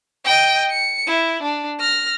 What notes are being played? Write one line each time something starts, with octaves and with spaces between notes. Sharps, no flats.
D#5 G5
C#7
E4
D4
F6 A#6